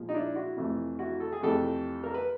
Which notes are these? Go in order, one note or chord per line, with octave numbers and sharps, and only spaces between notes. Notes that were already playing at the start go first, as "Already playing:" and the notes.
Already playing: A#2 F3 G#3
D#4
D4 E4
E4 F#4
F2 C3 E3 A3
E4 F#4
A4
G#4
F2 C3 E3 A3 G4 A4
A#4
B4